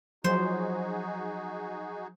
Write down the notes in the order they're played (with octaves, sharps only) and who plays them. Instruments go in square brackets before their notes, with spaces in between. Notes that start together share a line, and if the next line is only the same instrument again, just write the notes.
[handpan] F3 F#3 [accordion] D#4 F#4 G#4 [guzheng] C5